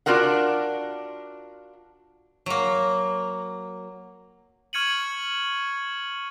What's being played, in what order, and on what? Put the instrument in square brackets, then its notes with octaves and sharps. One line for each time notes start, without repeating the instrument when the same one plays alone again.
[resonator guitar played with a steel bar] D4 F4 F#4 A#4 F#5
[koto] F#3 A#3
[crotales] C#6 F6 G#6 C#7 D#7 F#7